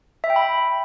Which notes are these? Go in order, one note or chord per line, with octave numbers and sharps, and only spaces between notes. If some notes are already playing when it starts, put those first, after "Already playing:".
E5
G5
B5